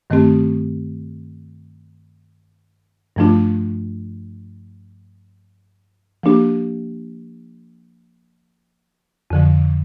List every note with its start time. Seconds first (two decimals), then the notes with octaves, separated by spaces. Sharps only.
0.10 G2 D#3 A3 C4 G4
3.16 G2 F3 A3 D4 F4
6.23 F3 A#3 D4 G4
9.30 F2 D3 F3